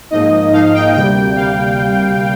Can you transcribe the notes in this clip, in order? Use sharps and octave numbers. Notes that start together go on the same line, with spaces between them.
G#2 F3 A#3 D#4 D#5
G#2 F3 A#3 D#4 F5
G5
D2 C3 G3 A#3 G5
D2 C3 G3 A#3 F5